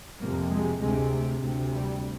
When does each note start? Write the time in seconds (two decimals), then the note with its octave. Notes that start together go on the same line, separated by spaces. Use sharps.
0.20 F2 C3 A#3
0.50 G#3
0.80 D2 C3 G#3
1.40 D2 C3
1.71 G3